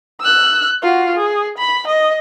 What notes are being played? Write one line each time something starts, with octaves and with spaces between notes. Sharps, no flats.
E6 F#6
F4 F#4
G#4
B5
D#5